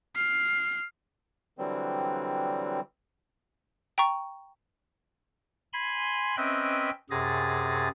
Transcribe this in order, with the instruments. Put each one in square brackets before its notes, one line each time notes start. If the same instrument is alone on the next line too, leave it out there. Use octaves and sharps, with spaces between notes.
[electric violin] F6 C7
[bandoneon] D3 E3 F#3 G3 C4
[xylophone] G5 A#5 C#6
[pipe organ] G#5 B5 C6
C4 C#4 B4 D#5 E5 G5
F#2 C3 G#4 A6 A#6